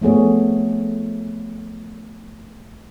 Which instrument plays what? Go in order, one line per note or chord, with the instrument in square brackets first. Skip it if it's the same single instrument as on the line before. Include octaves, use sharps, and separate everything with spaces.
[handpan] F3 A3 B3 G#4 C#5